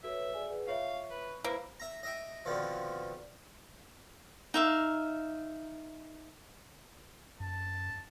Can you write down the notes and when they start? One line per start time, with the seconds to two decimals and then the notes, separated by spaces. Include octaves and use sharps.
0.03 F#4 A4 B4 C#5 E5
0.34 G#4 D5 G#5
0.50 G#4 B4 F#5
0.67 F4 C#5 E5 F5 C#6
1.10 B4
1.44 A#3 E4 B4 C5
1.80 E5 A#5
2.03 D#5 E5 G5
2.45 F2 B2 D3 D#3 F3
4.54 D#4 E5 F5
7.40 F#2 A5